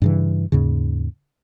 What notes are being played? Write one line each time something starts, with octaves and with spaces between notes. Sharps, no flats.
G2 C#3 E3
D#2 G#2 C#3